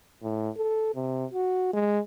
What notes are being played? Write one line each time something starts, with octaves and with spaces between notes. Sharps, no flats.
A2
A4
C3
F#4
G#3